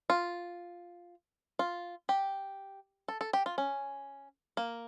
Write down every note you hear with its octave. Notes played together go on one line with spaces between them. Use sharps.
F4
F4
G4
A4
A4
G4
F4
C#4
A#3